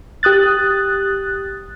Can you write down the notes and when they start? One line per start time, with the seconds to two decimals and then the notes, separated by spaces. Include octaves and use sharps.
0.23 G4 D#6 F#6 A6